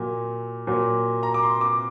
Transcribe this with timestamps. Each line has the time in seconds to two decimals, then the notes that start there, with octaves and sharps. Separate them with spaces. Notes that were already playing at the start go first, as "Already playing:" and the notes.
Already playing: A#2 F#3
0.67 A#2 F#3
1.23 A#5
1.34 D6
1.43 C6
1.61 D6